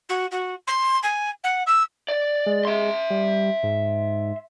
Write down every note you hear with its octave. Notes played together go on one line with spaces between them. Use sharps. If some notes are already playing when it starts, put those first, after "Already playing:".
F#4
F#4
C6
G#5
F#5
E6
D5
G#3
E5 C6
G3
G#2